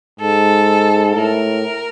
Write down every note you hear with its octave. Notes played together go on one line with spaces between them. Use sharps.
G#2 A4
A2 A#4